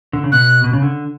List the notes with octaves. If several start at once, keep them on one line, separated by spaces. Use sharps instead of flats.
D3
C#3
B2 F#6
B2
C#3
D3